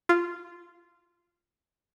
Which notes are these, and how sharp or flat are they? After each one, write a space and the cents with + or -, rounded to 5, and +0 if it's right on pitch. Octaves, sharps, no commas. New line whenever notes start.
F4 -10